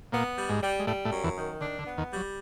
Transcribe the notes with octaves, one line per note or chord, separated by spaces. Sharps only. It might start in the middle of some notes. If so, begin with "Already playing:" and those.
A#2 A#3 B3
G3
G#2 G#3
G3
G#3
A2 G3 A3
A2 A3
F#2
E2 E3
D#3
D3 D4
D3
B3
D#2 D#3
G3
F#3